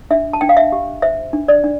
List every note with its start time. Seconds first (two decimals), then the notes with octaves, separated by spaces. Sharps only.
0.11 D4 E5
0.33 A5
0.41 D4 G5
0.49 F5
0.57 E5
0.72 G4
1.02 C5 E5
1.33 D4
1.48 D5
1.64 D4